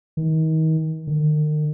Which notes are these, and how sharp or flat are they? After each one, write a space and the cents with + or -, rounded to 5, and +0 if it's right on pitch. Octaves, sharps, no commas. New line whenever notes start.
D#3 +35
D#3 -40